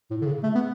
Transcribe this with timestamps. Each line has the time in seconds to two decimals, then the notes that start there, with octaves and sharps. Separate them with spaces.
0.11 A2
0.22 D3
0.26 C#3
0.43 A3
0.55 B3